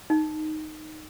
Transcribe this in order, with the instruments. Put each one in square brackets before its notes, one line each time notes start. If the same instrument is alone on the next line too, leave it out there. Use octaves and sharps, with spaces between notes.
[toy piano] D#4